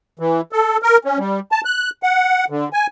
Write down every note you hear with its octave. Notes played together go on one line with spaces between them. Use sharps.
E3
A4
A#4
C#4
G3
A5
F#6
F#5
D3
G#5